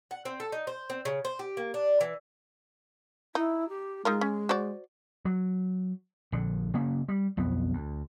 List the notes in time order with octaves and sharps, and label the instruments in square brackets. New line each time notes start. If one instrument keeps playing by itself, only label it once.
[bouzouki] F#5
C4
A4
D#4
C5
C4
C#3
C5
G4
A#3
D4
E3
[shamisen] D#4 [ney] E4
[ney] G4
[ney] G#3 [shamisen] D#4 F4 A#4
[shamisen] C#4
F#4 C5 D5
[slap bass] F#3
A#1 D3
C#3 A#3 C#4
G3
B1 F2 B3
D2